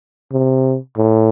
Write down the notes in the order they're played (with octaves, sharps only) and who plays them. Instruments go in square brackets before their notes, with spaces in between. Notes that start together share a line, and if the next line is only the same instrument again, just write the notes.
[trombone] C3
A2